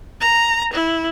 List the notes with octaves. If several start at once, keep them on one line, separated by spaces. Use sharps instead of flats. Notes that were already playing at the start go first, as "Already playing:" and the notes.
A#5
E4